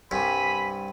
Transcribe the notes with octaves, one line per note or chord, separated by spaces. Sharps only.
C2 G2 G#5 B5 B6